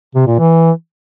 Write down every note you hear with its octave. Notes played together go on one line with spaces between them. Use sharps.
C3
A#2
E3